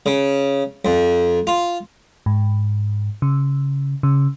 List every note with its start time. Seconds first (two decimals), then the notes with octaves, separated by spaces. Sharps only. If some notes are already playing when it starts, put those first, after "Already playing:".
0.06 C#3
0.85 F2
1.47 F4
2.26 G#2
3.22 C#3
4.03 C#3